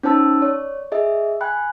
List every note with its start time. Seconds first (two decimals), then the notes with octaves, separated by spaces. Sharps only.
0.03 C#4 D#4 C5 A5 E6 A6
0.42 C#5 D5
0.92 G#4 D#5 E5
1.41 G5 G#5 B5 F#6